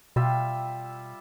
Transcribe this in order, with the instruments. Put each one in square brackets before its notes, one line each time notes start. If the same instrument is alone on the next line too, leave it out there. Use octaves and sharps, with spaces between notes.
[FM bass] B2 [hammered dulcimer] G3 F4 E5